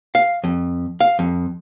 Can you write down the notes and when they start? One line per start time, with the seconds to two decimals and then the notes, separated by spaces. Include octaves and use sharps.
0.15 F5
0.44 F2
1.00 F5
1.19 F2